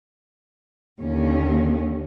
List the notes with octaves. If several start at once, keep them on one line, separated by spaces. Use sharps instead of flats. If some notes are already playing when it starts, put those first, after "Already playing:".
D#2 D3 C#4